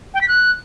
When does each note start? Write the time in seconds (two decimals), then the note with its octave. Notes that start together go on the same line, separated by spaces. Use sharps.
0.14 G5
0.21 B6
0.28 F#6